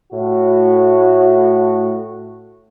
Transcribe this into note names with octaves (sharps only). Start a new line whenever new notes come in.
A2 F#4